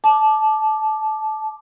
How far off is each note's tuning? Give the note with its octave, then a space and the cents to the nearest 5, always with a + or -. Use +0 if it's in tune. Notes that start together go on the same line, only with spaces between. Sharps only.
A5 -20 D6 +10